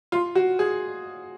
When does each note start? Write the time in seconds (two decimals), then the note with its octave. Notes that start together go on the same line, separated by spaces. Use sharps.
0.12 F4
0.35 F#4
0.59 G#4